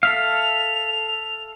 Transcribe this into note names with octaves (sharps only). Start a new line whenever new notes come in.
A4 E5 F5 F7